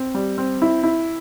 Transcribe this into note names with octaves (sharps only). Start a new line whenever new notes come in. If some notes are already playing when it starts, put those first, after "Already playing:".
Already playing: C4
G3
C4
E4
E4